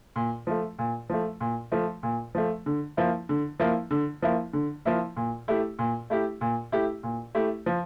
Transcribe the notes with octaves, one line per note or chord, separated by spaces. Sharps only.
A#2
F3 A3
A#2
F3 A3
A#2
F3 A3
A#2
F3 A3
D3
F3 A#3 E4
D3
F3 A#3 E4
D3
F3 A#3 E4
D3
F3 A#3 E4
A#2
A3 E4 G4
A#2
A3 E4 G4
A#2
A3 E4 G4
A#2
A3 E4 G4
F3